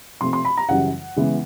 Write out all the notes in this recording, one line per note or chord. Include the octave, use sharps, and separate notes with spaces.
C3 F3 A3 C4 C6
C6
B5
A#5
F#2 C#3 E3 G3 F#5
C#3 E3 G#3 B3